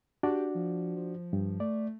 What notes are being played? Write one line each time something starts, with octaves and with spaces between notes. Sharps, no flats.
D4 F#4 G4 D5
F3
F3
G2
A3 D5